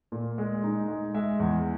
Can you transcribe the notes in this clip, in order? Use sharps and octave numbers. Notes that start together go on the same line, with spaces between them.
A#2
G#3
D#4
G#3
G#3 E5
E2